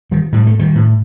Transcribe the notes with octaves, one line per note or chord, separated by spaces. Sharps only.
D#3 G3
A2 G3
A3
D#3 G3
A2